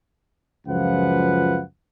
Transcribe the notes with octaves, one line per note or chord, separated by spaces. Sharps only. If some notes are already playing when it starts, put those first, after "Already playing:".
C#2 F#2 F3 F4 B4 F#5